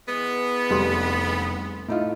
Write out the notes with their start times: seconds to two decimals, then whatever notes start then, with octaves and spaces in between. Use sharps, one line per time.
0.08 E3 G#3 B3
0.70 F1 G3 C6
1.88 A2 D#4 F4